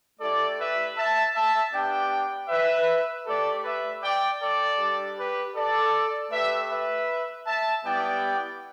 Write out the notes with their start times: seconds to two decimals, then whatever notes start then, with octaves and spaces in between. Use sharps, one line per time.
0.20 A3 E4 G4 A4 D5
0.58 B4 E5
0.97 E5 A5
1.34 E5 A5
1.73 B3 D4 G4 D5 G5
2.49 B4 E5
3.26 A3 G4 A4 D5
3.65 B4 E5
4.03 D5 G5
4.40 A4 D5
4.78 G3 D4 G4
5.17 G4 B4
5.56 A4 D5
6.31 A3 G4 B4 E5
6.70 B4 E5
7.47 E5 A5
7.84 G3 B3 E4 G4 D5 G5